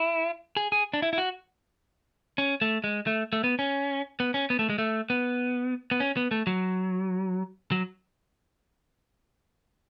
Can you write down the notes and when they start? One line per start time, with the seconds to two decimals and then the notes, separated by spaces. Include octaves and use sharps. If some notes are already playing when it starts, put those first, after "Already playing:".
Already playing: E4
0.57 G#4
0.72 G#4
0.94 D4
1.02 E4
1.13 E4
1.18 F#4
2.38 C#4
2.61 A3
2.84 G#3
3.07 A3
3.33 A3
3.44 B3
3.59 C#4
4.20 B3
4.34 C#4
4.50 B3
4.59 A3
4.70 G#3
4.78 A3
5.10 B3
5.91 B3
6.00 C#4
6.17 B3
6.31 A3
6.47 F#3
7.72 F#3